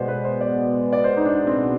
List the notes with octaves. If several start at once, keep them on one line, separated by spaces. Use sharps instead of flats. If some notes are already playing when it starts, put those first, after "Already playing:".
Already playing: B2 G#3 B3 C5 D5
B4
C5
D5
D5
C5
D#4
D4
C4